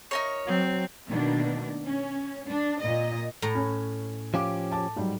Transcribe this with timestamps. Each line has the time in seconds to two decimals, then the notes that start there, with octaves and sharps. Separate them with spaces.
0.11 D#4 A#4 C#5
0.47 F#3 C4
1.09 B2 D#3 A3 A#3 D4
1.85 C#4
2.48 D4
2.83 A#2 D#5
3.42 A2 A#5
3.55 C#4
4.34 F3 C#4 G4 F5 D6
4.71 A5 D6
4.96 G#2 F#3 G3